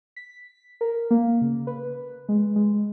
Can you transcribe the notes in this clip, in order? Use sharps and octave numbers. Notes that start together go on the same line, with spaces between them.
B6
A#4
A#3
C#3
B4
G#3
G#3